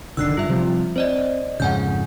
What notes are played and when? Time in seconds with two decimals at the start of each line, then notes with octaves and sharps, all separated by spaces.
0.17 F1 D3 D#3 E6 F#6 C7
0.37 G2 F4 E5
0.49 C3 F3 G3
0.96 C4 C5 D5 D#5
1.60 F2 G#2 C#3 F#5 G#5 G6